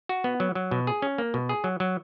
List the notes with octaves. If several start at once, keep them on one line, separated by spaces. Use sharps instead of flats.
F#4
B3
F#3
F#3
B2
G#4
C#4
A#3
B2
G#4
F#3
F#3